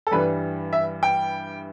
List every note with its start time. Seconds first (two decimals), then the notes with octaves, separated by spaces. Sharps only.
0.07 A4
0.11 G2 E3 G3 B4
0.73 E5
1.03 G5